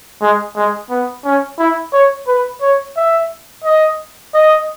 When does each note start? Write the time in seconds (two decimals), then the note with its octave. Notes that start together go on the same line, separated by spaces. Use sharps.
0.21 G#3
0.56 G#3
0.90 B3
1.25 C#4
1.59 E4
1.93 C#5
2.28 B4
2.61 C#5
2.96 E5
3.64 D#5
4.34 D#5